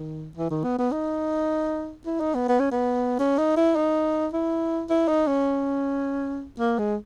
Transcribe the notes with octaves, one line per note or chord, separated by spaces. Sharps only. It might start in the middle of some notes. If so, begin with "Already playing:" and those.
Already playing: D#3
E3
D#3
B3
B3
D#4
E4
D#4
B3
B3
C#4
B3
C#4
D#4
E4
D#4
E4
E4
D#4
C#4
A#3
G#3